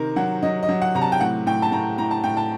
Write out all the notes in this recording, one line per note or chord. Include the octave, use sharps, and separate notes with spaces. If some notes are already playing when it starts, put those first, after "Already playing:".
Already playing: C3 D#3 A#4
F#3 F#5
F#3 D#5
D#5
F#3
F#5
C3 A#5
A5
G5
A2 F#5
A2 G5
A5
A2 A#5
A2 A#5
A5
A2 G5
A5